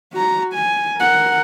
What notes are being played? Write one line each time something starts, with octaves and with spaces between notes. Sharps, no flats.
F#4 A#5
G#5
A#4 F#5